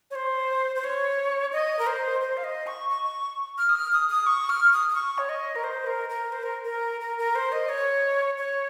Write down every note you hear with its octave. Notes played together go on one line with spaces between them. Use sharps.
C#5
C5
C5
C#5
D#5
A#4
C5
C5
F5
D#5
C#6
C#6
F6
D#6
F6
D#6
D#6
C#6
F6
D#6
D#6
C#6
C#5
D#5
A#4
C5
A#4
A#4
C5
A#4
A#4
A#4
A#4
C5
D#5
C#5
C#5